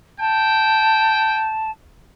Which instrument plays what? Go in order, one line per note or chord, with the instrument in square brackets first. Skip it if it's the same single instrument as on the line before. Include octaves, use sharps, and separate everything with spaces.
[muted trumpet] G5 [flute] A5